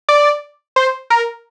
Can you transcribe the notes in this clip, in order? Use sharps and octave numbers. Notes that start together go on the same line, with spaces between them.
D5
C5
A#4